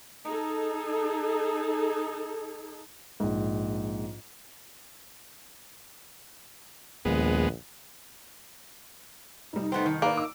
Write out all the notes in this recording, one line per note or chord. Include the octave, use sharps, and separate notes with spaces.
D#4 G#4 A4
A#1 G#2
A#1 D#2 G#3 B3
F1 G3 D#4
A3 B3 C4
D#3
A#3 G#4 B4 D5
D6 E6